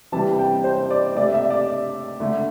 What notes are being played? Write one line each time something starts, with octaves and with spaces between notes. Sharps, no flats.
C3 E3 G3 A5
G5
C5
D5
C3 A3 D5
E5
D5
D3 A3